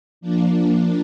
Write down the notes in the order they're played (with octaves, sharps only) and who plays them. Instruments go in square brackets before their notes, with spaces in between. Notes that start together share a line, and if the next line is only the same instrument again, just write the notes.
[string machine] F3 A#3 D4